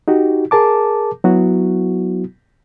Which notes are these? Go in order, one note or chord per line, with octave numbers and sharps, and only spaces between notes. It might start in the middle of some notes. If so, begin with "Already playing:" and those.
D#4 F#4 G4
G#4 A#4 A5 D6
F#3 B3 E4 F#4